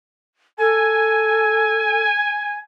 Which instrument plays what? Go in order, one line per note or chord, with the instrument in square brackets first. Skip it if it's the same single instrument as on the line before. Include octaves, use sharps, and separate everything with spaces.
[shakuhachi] A4 [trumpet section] G#5